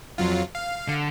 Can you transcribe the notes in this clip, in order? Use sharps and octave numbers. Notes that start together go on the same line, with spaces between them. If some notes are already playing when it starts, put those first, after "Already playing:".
F2 F#3 F4
F5
D3